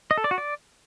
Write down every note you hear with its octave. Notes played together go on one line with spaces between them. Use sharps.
D#5
A4
D5
F#4
D5